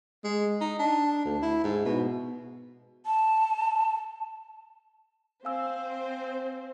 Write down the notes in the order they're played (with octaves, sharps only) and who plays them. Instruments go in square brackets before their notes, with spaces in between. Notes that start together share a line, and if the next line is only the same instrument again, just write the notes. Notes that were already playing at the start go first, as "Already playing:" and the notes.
[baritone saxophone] G#3
D#4
D4
D2
E4
G#2
B2
[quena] A5
[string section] C4 C5 [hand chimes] F5 G#5 E6